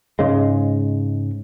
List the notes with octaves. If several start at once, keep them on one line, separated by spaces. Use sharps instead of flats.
G#2 C#3 G#3